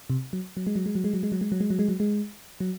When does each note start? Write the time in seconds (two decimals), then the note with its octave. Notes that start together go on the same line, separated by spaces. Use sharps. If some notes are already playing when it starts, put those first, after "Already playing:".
0.10 C3
0.33 F#3
0.57 F#3
0.67 G#3
0.76 F#3
0.86 G#3
0.95 F#3
1.04 G#3
1.13 F#3
1.23 G#3
1.32 F#3
1.41 G#3
1.52 F#3
1.60 G#3
1.70 F#3
1.79 G#3
1.88 F#3
2.00 G#3
2.60 F#3